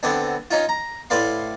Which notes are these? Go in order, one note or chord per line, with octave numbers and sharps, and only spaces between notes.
D3 B3 C4 D4
C#4 D#4 F4
A#5
A2 B4 D5 F5 C6